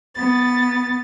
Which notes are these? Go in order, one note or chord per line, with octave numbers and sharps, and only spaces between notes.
B3 A6